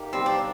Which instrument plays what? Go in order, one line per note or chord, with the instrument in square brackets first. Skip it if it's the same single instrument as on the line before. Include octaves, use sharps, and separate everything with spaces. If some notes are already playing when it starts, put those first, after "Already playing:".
Already playing: [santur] A#3 D#4 G4 A#4
[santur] G3 [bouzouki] C4
[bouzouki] D4